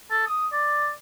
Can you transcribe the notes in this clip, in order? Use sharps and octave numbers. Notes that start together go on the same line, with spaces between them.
A4
D#6
D5